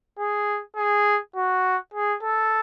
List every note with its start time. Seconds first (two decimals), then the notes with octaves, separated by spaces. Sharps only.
0.19 G#4
0.76 G#4
1.36 F#4
1.94 G#4
2.23 A4